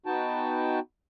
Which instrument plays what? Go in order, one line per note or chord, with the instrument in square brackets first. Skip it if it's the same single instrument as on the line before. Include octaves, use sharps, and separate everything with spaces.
[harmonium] B3 D#4 F#4 G5 A5